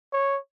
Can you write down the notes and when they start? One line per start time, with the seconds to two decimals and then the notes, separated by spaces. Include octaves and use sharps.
0.13 C#5